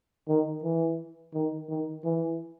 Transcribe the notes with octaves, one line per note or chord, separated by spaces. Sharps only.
D#3
E3
D#3
D#3
E3